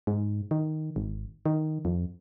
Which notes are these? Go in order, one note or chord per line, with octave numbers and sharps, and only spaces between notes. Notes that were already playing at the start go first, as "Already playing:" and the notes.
G#2
D#3
G#1
D#3
F2